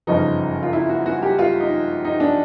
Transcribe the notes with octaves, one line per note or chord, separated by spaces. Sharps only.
G1 F#2 C#3 F3 D#4
F4
E4
F#4
F#4
G4
F4
D#4
D#4
D4